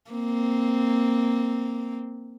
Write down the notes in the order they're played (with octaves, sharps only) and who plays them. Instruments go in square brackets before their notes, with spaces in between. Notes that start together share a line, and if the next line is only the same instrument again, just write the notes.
[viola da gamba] A#3 C4